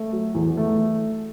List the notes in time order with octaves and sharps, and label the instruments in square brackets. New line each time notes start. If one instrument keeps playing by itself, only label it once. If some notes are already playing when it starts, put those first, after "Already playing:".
Already playing: [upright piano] A3
F#3
E2
A3